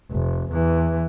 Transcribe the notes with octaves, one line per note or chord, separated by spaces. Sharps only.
F1
E2 E3